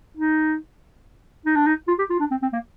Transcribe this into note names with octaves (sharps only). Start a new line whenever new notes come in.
D#4
D#4
D4
D#4
F4
G4
F4
D4
C4
C4
A#3